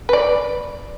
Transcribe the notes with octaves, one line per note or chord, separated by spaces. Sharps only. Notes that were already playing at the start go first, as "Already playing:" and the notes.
B4 D5